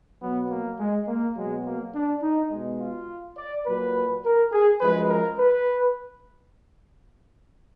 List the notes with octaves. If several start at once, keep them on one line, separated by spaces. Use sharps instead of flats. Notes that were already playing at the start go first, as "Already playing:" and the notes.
B2 F#3 B3
A#3
G#3
A#3
B2 F#3 G#3
A#3
D4
D#4
B2 G#3
F4
D5
A#2 F#3 B4
A#4
G#4
F#2 F3 G#3 B4
A#4
B4